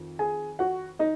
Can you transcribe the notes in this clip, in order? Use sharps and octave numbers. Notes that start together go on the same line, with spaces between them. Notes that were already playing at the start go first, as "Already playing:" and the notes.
Already playing: F2 D#3
G#4 G#5
F#4 F#5
D#4 D#5